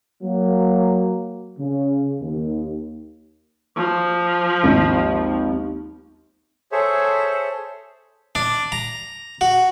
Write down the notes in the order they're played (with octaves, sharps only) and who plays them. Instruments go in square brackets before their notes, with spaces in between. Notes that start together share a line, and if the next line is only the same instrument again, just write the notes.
[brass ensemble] F#3 A#3
C#3
D#2
[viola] F3
[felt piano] G#1 D#2
[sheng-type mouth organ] G#4 A4 C5 C#5 E5
[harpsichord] D4
A#5
F#4